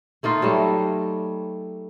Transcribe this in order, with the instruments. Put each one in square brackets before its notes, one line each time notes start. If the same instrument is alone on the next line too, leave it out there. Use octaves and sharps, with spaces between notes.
[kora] A3 A#3 D#4 F4
F#3 G3 A3